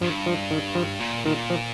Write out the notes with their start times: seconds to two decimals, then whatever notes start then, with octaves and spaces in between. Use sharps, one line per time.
0.01 G2 F3
0.26 F3
0.51 D#3
0.75 F3
1.00 A#2
1.25 A#2 D#3
1.50 F3